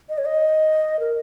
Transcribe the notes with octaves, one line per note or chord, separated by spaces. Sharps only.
D#5
C#5
D#5
A#4